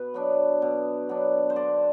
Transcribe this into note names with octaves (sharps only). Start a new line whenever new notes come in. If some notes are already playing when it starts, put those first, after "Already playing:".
Already playing: B2 B4
F#3 B3 D4
B2
F#3 B3 D4
C5
D3 D5